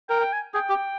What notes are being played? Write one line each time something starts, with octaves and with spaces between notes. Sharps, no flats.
A#4 G5
G5
G#5
G#4 G5
G4